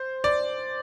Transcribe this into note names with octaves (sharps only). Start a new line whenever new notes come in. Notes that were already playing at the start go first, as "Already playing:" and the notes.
Already playing: C5
D5